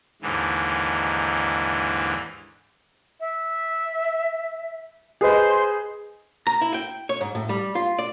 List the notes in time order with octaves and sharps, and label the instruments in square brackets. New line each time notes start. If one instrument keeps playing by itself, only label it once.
[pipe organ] D#2 G#2 D3 E3
[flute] E5
[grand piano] G#4 B4 D#5 [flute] C5
[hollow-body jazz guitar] A#5
E4
G5
C#5
G#2
A2
G3
F4
D5